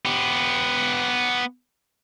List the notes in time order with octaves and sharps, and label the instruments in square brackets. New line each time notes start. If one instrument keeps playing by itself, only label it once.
[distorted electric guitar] B3 G4